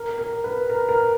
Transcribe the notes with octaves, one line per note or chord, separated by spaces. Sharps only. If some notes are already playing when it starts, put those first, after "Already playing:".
Already playing: A#4
A#4
B4
A#4
A#4